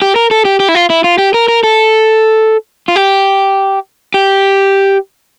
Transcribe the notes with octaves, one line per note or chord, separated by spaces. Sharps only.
G4
A#4
A4
G4
G4
E4
F4
E4
F4
G4
A#4
A#4
A4
F4
G4
G4